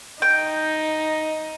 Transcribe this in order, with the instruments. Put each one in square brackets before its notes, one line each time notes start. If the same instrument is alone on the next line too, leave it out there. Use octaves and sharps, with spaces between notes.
[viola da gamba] D#4 [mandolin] G5